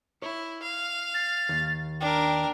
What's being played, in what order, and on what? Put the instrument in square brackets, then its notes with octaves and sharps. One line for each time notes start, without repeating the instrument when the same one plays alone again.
[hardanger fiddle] E4 [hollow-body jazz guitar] C#5
[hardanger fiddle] F5
[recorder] A6
[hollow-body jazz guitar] D#2
[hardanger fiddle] D4 A#4 [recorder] G5